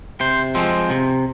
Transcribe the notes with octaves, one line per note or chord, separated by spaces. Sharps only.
C3 C5
F3 G#3 C4
C3